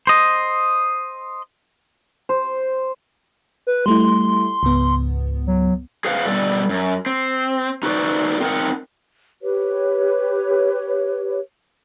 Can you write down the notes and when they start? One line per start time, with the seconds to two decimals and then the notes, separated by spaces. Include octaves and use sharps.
0.07 C5 D#5
2.29 C5
3.67 B4
3.86 G3 A3 E4 C6
4.63 C#2 G#2 B3
5.47 F#3
6.05 G#4 B4 C5 F5 F#5
6.26 B2 G3 A4 D5
6.69 F#2
7.06 C4
7.83 D#4 F#4 A4 B4 C5 D5
8.40 C4 D#4 A#4 F#5
9.42 G4 B4 C#5